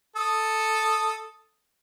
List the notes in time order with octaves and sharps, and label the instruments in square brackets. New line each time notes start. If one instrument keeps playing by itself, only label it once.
[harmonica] A4 D#6